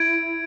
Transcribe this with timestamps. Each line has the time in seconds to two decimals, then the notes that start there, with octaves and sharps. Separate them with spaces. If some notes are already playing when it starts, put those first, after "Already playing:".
Already playing: E4 G#6 D7